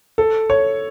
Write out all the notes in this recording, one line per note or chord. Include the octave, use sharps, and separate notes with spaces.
A4
C#5